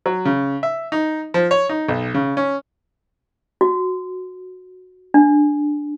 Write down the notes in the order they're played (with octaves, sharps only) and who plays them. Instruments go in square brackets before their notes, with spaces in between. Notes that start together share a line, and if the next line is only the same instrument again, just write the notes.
[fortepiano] F#3
C#3
E5
D#4
F3
C#5
D#4
B1
C#3
C#4
[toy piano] F#4
D4